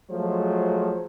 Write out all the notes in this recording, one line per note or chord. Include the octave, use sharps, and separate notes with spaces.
F3 F#3 G#3 A3 C5